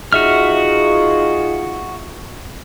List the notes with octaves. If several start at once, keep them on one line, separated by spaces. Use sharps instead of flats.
D#4 F4 F#4 G#4 E5 F6